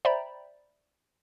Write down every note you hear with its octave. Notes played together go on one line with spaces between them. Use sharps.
C5 D5 E5 G5 A#5 B5